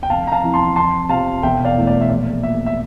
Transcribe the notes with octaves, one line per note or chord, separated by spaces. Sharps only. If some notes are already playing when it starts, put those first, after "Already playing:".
G5
F1 F5 A5
A#5
F5 A5
F2 E3
A5 C6
F2 A5 C6
C3 F3 F5 A5
E1 E5 G5
D5 F5
E2 E3 A3
D5
E5
A#1 D5
A#2 A3 E5
E5